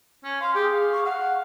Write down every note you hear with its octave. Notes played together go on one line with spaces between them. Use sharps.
C#4
F5 C6
G4 G#4
F5
C#6
F5 F#5